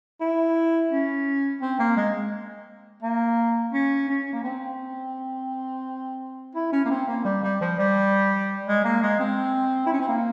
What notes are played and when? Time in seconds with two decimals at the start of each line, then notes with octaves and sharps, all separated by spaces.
0.21 E4
0.92 C#4
1.61 C4
1.79 A#3
1.97 G#3
3.03 A#3
3.72 C#4
4.09 C#4
4.33 A#3
4.44 C4
6.55 E4
6.73 C#4
6.85 A#3
6.91 C4
7.08 A#3
7.25 G3
7.43 G3
7.61 F3
7.79 G3
8.67 G#3
8.85 A#3
9.02 G#3
9.20 C4
9.86 E4
9.93 C#4
10.00 C4
10.08 A#3